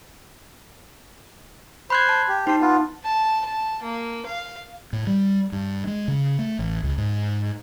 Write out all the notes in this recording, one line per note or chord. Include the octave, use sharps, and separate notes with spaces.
C5 B5 F#6 G#6
A5
G4
D#4 G4 C5 A5
B3 F4
A5
A5
A#3
F5
A2
G3
G2
G#3
C#3
A3
A1
C#2
G#2